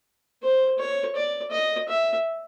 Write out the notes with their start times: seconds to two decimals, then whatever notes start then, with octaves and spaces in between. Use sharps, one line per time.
0.42 C5
0.78 C#5
1.16 D5
1.51 D#5
1.89 E5